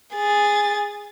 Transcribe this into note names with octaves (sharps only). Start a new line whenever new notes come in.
G#4 A6